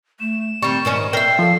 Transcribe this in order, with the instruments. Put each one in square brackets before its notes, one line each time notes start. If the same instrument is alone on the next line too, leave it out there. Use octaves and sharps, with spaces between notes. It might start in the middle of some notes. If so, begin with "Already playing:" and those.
[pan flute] A3 [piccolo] E7
[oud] D#3 G3 [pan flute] C4 [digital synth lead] C#6
[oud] G#2 D#3 C#4 [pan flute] D5
[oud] A#4 E5 [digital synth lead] G5 [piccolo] C7
[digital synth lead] F3 [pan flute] A4